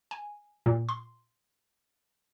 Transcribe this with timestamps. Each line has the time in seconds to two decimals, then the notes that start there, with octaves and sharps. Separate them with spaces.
0.11 G#5
0.66 A#2
0.89 C6